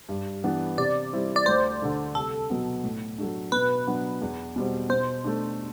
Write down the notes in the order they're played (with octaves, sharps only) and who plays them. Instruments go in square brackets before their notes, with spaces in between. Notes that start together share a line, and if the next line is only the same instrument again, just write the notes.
[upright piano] G2
E3 B3 D4
[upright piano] C3 [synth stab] D5
[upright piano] G3 C4 E4
[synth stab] D5
[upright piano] D2 [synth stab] C5
[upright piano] D3 A3 D4
[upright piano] C2 [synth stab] A4
[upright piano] B2 F#3 B3
A2
F#3 A3 D4
[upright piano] B2 [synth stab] B4
[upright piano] F#3 B3 D4
E2
B2 G3 C4
[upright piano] B2 [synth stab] C5
[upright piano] A3 D4